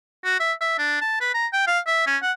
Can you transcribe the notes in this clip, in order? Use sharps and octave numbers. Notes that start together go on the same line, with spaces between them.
F#4
E5
E5
D4
A5
B4
A#5
G5
F5
E5
C#4
F#5